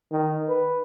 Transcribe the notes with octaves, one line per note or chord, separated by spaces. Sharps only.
D#3
B4